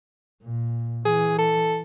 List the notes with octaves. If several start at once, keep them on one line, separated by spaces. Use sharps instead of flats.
A#2
E3 G#4
A4